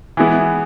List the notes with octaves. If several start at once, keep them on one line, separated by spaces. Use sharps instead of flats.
E3 G#3 B3 E4